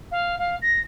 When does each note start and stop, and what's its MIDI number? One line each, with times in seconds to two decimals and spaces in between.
0.11 0.35 77
0.38 0.55 77
0.61 0.80 94